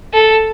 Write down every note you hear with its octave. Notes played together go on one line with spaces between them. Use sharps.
A4